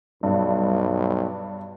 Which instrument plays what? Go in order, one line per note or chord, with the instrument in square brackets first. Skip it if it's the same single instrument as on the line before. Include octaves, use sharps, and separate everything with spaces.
[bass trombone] B1 [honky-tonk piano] G2